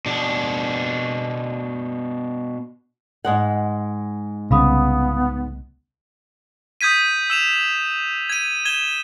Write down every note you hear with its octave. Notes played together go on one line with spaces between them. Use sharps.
B2 D4
G#2 G#3 F#5
C2 C#3 B3 F5 B5 D#6
D#6 G6 G#6 B6 D#7
E6 E7 F7
G#6 D#7
G#6 E7 G7